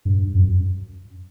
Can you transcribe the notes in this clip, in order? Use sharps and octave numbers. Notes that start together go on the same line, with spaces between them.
G2
F#2